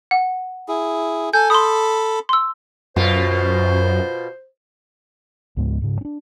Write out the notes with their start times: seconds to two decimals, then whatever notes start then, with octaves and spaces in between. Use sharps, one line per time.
0.11 F#5
0.68 E4 G#4
1.33 A4 G#5 G6
1.50 A4 B5 C6 D#6
2.29 C6 E6
2.96 F#2 B2 F4 C5
5.57 C#2 G#2 G#3 B3
5.82 G#2 C#3
6.01 C#4 D4